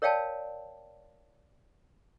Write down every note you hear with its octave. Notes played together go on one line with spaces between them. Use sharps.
A#4 C#5 D5 F5 G5 A5